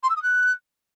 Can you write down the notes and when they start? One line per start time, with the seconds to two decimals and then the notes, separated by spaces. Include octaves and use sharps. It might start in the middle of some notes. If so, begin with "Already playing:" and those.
0.03 C6
0.10 E6
0.16 D#6
0.22 F#6